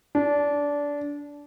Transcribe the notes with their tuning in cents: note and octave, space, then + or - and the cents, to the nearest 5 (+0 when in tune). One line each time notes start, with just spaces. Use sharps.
D4 -20